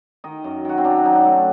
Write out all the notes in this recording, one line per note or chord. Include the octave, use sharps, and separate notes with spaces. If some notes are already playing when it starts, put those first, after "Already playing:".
D#3 D#5
F#2
D#3 F#4
C4
F#3 D4
F#3 D#4
D4
A3